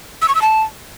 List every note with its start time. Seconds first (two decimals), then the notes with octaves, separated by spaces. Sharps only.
0.22 E6
0.28 C#6
0.35 E6
0.42 A5